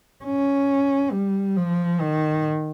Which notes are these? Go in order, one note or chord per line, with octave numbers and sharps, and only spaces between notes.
C#4
G3
F3
D#3